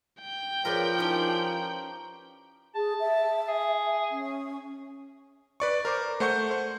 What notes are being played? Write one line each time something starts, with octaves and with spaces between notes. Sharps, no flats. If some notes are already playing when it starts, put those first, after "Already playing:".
G5
F3 G#4 A#4 B4 C#5 D5
C#4 D#4 E4 G4 A5
A#5
G#4 A5
E5
G#4
C#4
B4 D5 C#6
A#4 C5 D6
A3 C5 F#5 C#6 G6
C5